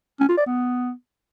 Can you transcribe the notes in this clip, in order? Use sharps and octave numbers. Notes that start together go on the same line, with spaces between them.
C#4
F4
D5
B3